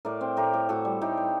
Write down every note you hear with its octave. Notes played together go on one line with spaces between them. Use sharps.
A2 A#4 D5
C4
A2 G4 A#4
A2
A2 F#4 A4
G3
A2 D#4 G4
G3